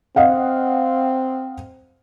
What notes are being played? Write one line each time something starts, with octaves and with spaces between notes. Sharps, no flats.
C4 D#5 F5 F#5